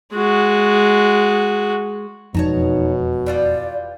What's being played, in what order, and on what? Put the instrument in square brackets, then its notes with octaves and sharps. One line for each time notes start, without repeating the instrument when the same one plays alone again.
[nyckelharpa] G#3 F#4
[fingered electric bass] E1 F2 [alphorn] B2 [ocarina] D#4 [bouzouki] C#5 A5 A#5
[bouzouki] E3 G3 F4 [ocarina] D5